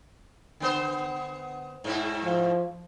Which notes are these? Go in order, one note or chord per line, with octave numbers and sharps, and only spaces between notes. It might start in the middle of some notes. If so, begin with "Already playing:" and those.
D3 B3 C5
G#2 B2 E4
F3